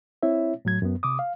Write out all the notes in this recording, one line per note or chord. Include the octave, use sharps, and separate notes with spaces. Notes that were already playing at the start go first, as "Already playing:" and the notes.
C4 E4 C#5 E5
A2 F#3 G#6
F#2 B3
C3 D6 D#6
F5